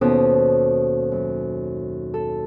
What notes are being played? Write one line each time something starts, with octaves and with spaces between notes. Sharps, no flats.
D#2 B2 C#4 A4 C5 D#6
F#2
A4